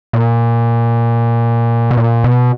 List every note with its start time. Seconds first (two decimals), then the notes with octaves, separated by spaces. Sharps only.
0.13 A#2
1.91 B2
1.97 A#2
2.24 B2